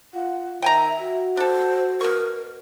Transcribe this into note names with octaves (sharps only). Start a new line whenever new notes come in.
F4 F#5
D#3 E5 G5 G#5 A#5
F#4
D4 A4 C5
B2 A#4 C#6